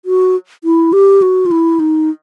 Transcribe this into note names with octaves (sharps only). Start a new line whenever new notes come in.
F#4
E4
G4
F#4
F4
E4
D#4